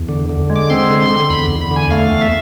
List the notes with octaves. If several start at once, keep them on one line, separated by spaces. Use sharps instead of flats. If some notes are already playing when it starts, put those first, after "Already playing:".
Already playing: E2
D3
D3
G#3
D6
C4 C6
D3
D3
E2 B5
E2
B5
D3 G#5
A3 F5
E2
E5